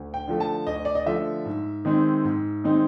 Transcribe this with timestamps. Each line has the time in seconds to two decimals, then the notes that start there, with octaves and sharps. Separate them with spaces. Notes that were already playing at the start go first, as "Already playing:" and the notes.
Already playing: D2
0.14 G5
0.28 D3 F3 A3
0.40 A5
0.67 D2 D#5
0.85 D5
0.95 D#5
1.06 D3 F3 A3 E5
1.46 G#2
1.85 D#3 G#3 C4 D#4
2.25 G#2
2.64 D#3 G#3 C4 D#4